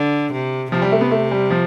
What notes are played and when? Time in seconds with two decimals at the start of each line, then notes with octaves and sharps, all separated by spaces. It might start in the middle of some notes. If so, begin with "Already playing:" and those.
Already playing: D3
0.33 C3
0.71 C3 F3
0.82 G3
0.92 A3
1.01 B3
1.11 A3
1.31 G3
1.51 F3